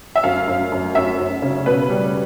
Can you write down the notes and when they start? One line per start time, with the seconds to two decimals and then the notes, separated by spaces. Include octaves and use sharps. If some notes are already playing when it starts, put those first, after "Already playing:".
0.16 E5
0.23 F#2 F5
0.48 F#2
0.72 F#2
0.95 F#2 E5
1.18 F#2
1.42 C#3
1.66 B2 B4
1.90 G3